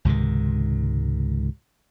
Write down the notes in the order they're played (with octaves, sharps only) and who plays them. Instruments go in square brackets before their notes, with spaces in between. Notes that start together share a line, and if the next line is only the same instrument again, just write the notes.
[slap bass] C#2 G#2 C3 D#3